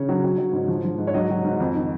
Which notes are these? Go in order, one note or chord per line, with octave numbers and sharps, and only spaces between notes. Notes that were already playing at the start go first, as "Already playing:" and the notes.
Already playing: C#3 C#5
F#3
F#3
F#3
G#2
F3
F3
G#2
C#5
F#3 D#5
F#3
G#2
F2
D#3